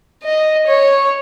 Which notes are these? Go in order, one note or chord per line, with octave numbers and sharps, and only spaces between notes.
D#5
C#5